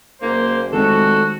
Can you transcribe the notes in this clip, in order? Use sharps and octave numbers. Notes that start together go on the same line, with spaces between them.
F#1 A#3 C5
F1 D#3 G#3 C4 F#4 A4